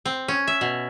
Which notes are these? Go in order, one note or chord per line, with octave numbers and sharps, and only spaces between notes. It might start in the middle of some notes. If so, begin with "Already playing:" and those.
C4
C#4
E5
B2